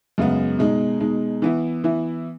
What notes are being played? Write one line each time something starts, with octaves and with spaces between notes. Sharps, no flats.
F#2 C#3 G#3 B3
B2 G#3 D#4
B2 G#3 D#4
E3 B3 E4
E3 B3 E4